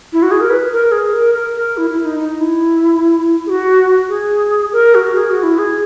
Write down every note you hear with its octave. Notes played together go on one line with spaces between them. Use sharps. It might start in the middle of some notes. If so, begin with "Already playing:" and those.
E4
F#4
G#4
A#4
B4
A#4
G#4
A#4
A#4
A#4
E4
E4
D#4
D#4
E4
G#4
F#4
G#4
A#4
F#4
G#4
F#4
E4
G#4